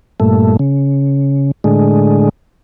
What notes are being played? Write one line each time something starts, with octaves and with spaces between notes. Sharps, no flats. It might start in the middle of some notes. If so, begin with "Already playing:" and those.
G2 A#2 A3
C#3
A2 D3 G#3